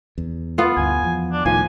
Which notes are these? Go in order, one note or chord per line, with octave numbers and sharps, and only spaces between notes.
E2
B3 F4
D2 G2 G#5
E2 F3
D4
C#2 A2 D#3 F3 G#5